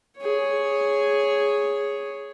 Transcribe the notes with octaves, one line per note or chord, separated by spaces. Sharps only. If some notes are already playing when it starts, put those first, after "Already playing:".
G#4 C#5